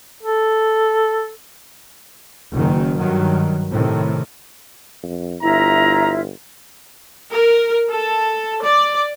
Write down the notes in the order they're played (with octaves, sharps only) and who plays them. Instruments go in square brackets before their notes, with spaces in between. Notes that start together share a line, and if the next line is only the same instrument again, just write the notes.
[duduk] A4
[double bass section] F#1 F#2 D#3
G2 D#3 F#3
A2 C3 D#3
[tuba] F2
[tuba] G1 [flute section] E4 F4 E5 [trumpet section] A#5
[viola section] A#4
A4
D5